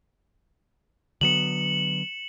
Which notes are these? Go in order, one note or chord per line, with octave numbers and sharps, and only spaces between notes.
D3 F#3 B3 C#7 E7 F#7